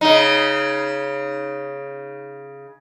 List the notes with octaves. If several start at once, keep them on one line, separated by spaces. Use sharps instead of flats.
C#3 D#4